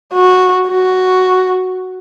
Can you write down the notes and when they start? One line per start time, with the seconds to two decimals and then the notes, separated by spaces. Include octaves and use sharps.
0.13 F#4
0.69 F#4